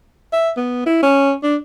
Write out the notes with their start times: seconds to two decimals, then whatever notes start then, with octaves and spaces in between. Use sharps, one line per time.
0.33 E5
0.57 B3
0.86 E4
1.03 C#4
1.43 D4